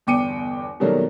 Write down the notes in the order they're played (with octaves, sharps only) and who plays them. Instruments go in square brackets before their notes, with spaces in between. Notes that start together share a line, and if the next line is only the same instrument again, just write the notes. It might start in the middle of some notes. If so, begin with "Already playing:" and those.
[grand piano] G1 E2 G5 D6 C#7 D#7
B2 D#3 F#3 G3 A3 A#3